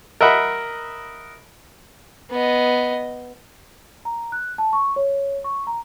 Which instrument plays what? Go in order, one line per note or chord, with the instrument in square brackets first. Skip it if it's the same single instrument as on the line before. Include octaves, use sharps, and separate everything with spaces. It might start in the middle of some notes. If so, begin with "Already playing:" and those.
[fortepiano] A#4 D#5 E5 F#5 B5
[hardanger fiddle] B3 D#5
[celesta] A#5
F#6
A5
C#6
C#5
C#6
A#5